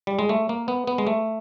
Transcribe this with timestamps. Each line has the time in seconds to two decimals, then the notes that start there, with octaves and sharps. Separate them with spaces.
0.07 G3
0.19 G#3
0.29 A3
0.49 A#3
0.68 B3
0.87 B3
0.98 G#3
1.07 A3